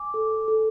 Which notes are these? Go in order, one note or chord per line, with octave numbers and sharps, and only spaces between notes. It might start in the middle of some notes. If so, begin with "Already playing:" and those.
Already playing: G#5 D6
A4
A4